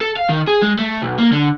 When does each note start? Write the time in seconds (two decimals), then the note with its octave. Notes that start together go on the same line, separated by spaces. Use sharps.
0.01 A4
0.17 F5
0.29 D#3
0.47 G#4
0.62 G#3
0.79 A3
1.02 B1
1.19 A#3
1.32 D3